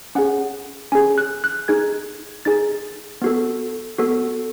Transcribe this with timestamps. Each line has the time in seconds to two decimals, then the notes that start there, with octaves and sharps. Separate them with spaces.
0.15 C#4 G#4 F#5
0.92 C#4 G#4 G#5
1.18 F#6
1.44 F#6
1.68 D#4 G#4 G#6
2.45 D#4 G#4 A6
3.22 B3 F#4 A4
3.98 B3 F#4 A4